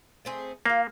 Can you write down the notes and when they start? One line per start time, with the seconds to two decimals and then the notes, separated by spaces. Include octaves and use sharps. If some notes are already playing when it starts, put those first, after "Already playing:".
0.25 A3 C4 G#4
0.66 A#3 F4 F5